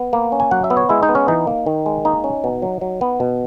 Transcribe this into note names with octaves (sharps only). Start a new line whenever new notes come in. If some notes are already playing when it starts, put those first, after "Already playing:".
Already playing: B3
A#3
C#4
G#5
F#3 F#5
E5
B3
C#5
G#3 E4
D#4
B3
C#4
E3 D#4
A#3
D#3
G#3
A#3 D#4
C#4
B2
F#3
F#3
B3
B2